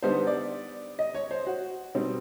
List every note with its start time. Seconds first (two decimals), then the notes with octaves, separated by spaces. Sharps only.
0.03 D3 G3 B3 D#4 C5
0.27 D5
0.99 D#5
1.15 C#5
1.31 C5
1.47 F#4
1.95 B2 G3 C4 D#4